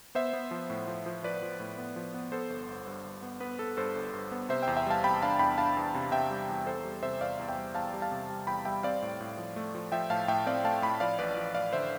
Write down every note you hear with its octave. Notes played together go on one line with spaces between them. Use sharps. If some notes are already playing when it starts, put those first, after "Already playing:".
B3 C5 E5
B3
F3
A2
F3
F3
F3 B4 D5
F3
A2
B3
F3
B3
B3 A4 C5
G1
G1
G2
G1
B3
B3 B4
B3 A4
G2 A4 C5
G1
G2
B3
C3 C5 E5
E2 E5 G5
E5 G5
G3 F5 A5
C3 G5 B5
D4 F5 A5
E2 G5 B5
D4 F5 A5
E2
C3
C3 E5 G5
G3
E2
E2 A4 C5
G3
C3 C5 E5
E2 D5 F5
E2 F5
E5 G5
G3
E2 F5 A5
G3
F5 A5
C3
G3
E2 G5 B5
G3 E5 G5
C4 D5 F5
A2
A2
F3
A3
F3
F3 E5 G5
A2 F5 A5
A2 E5 G5
C4 D5 F5
A3 F5 A5
A2 G5 B5
F3 D5 F5
A1 B4 D5
F3
A1 D5 F5
D3 C5 E5